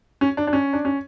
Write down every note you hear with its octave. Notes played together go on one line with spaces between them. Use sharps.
C#4
D4
D4
C#4
D4
C#4